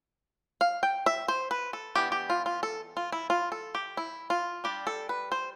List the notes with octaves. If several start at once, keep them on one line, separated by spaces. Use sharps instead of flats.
F5
G5
E5
C5
B4
A4
E3 B3 D4 G4
G4
F4
F4
A4
F4
E4
F4
A4
G4
E4
F4
G3 D4 G4
A4
B4
C5